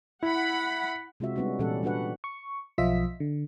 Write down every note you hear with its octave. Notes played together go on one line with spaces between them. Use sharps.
E4 F#5 B5
C3 G#3 C4 F4 F#4 E5
G3 G#3 B3 C#4 D#4 F#4
A#2 E3 G3 C#4 A4 F#5
G3 D4 F#4 B4 F#5
C#6
B1 F3 F4 D#5 E5 B6
D3